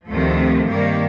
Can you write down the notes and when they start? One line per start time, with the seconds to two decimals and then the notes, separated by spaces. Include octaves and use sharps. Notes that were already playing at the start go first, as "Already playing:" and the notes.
0.08 D2 C3 D#3 F3 A3
0.68 G2 D#3 G3 A#3